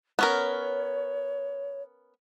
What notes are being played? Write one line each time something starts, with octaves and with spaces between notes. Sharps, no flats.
B3 C#4 A#4 C#5